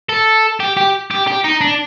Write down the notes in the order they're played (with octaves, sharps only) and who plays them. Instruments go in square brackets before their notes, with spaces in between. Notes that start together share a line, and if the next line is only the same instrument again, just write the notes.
[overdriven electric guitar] A4
G4
G4
G4
G4
D#4
D4